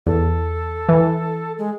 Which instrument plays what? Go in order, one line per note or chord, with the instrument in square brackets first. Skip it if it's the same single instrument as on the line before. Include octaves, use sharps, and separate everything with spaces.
[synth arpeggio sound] E2 [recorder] A4
[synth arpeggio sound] E3
[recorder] G#3